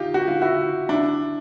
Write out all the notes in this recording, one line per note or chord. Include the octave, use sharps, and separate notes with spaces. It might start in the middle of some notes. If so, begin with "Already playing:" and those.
Already playing: D#4 F4 G4
F#4
F4
E4 F#4
D4 E4